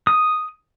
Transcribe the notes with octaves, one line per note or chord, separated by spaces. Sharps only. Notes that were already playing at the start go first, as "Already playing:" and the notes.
D#6